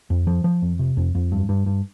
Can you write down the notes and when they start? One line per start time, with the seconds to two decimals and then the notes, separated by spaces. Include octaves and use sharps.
0.10 F2
0.27 F3
0.44 F3
0.62 F2
0.79 C3
0.97 F2
1.15 F2
1.32 G2
1.49 G2
1.66 G2